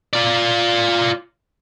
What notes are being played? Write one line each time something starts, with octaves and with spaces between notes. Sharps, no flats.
F4 D5